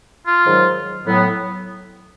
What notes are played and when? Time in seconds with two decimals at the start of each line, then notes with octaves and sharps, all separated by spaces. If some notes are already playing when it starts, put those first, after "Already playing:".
0.26 F4
0.46 G#2 D#3 F#3
1.05 A2 F#3 B3